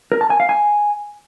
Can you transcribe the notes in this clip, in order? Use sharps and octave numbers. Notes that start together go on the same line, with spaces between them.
A#4
A5
G#5
F5
G#5